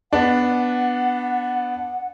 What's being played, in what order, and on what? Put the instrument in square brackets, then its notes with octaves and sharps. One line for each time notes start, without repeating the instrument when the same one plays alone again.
[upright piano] B3 D4 [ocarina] F#5